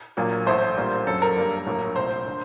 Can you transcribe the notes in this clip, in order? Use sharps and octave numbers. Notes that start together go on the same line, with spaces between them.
A#1 A#2 F#3 A#3
A1 A2 A3 C5
A#1 A#2 G3 A#3
G1 F#2 F#3 A4
A#4
G2 D3 G3 A#3
A#1 A2 F#3 A#3
C2 A#2 A3 C5
D3